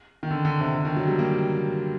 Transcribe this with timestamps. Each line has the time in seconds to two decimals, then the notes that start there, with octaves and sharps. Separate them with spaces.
0.23 D#3
0.31 D3
0.45 D3
0.60 C3
0.75 D3
0.85 D#3
0.96 F#3
1.08 G3
1.19 A#3